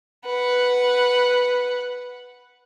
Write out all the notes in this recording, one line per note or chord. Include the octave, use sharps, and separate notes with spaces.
B4 F#5